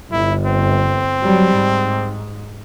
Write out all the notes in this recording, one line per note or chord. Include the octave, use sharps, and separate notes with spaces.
G1 E4
C4
F#3 G3
G#2